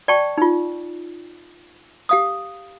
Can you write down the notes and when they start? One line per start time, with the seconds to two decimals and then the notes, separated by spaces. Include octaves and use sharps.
0.08 D5 G5 A5 C#6
0.38 D#4 F4
2.09 G4 F5 D#6